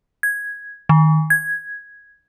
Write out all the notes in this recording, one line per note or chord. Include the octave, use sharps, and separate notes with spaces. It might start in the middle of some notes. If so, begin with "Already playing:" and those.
G#6
D#3
G#6